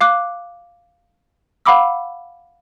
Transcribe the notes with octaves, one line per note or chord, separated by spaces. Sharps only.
F5 D6 F#6
F5 F#5 B5 D6 E6